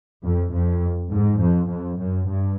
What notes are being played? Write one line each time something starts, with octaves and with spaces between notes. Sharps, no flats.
F2
F2
G#2
F2
F2
F#2
G2